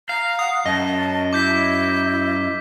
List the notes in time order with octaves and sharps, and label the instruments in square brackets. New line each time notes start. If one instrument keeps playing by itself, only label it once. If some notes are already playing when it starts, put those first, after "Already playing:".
[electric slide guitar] F5 [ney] A#5 [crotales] C7
[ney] F#5 [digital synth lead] D#6
[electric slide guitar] F#2 [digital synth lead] D#5 [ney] A5
[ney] E4 [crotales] D6 G6 B6